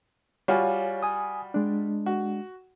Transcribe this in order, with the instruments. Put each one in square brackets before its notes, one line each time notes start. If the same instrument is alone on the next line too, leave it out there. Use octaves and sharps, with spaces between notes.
[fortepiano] G3 F4 F#4 [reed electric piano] C#5 F5 G#5
[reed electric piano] G#5 D#6
G#3 D4
[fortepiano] F#4